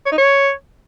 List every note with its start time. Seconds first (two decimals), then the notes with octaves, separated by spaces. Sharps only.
0.06 C#5
0.12 D#4
0.18 C#5